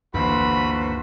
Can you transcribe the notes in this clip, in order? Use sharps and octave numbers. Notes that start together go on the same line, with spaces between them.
G1 D2 E3 A#3 F#4 B4 C5 B5